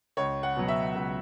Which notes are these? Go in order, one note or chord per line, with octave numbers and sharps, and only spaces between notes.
C#2 C#5
F#5
B2 F#3
E5
C#2